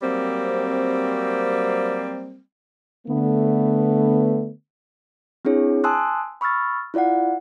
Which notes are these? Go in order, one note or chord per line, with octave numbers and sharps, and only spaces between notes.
F#3 G3 A#3 C4
D3 A3 B3
C4 D4 E4 G#4 C#5
G#5 A5 C6 D#6 E6 F#6
B5 C#6 E6 F6 A6
E4 F4 D5 F5 F#5